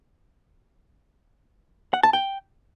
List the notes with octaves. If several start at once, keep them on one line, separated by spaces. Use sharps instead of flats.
F#5
A5
G5